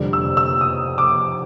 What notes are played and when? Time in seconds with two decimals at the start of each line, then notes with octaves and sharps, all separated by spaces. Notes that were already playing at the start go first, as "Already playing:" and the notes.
Already playing: F1 F2 D3 G3
0.13 E6
0.37 E6
0.61 D#6
0.98 D6